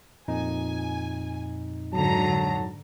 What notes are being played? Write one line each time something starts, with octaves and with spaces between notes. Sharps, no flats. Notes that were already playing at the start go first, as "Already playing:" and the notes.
F2 A#2 D#4 G#5
G#2 D3 F#3 A5 A#5